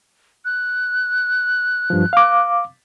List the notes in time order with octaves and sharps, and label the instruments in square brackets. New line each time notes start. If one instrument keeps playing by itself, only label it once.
[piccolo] F#6
[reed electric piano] G2 F3
F5 D6